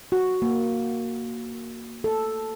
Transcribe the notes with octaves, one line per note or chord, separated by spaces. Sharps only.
F#4
A#3
A4